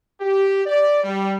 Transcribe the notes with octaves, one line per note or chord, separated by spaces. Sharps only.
G4
D5
G3